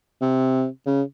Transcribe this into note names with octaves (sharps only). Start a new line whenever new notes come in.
C3
C#3